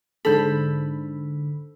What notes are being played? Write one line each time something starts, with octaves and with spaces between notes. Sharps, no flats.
G#2 D3 A4 C5 B5